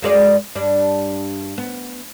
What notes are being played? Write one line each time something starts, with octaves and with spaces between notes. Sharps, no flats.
F#2 G#3 D5
G2 D4
B3